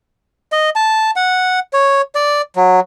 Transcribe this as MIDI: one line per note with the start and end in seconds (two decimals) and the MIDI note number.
0.52 0.70 75
0.76 1.11 81
1.16 1.59 78
1.73 2.02 73
2.15 2.42 74
2.56 2.80 54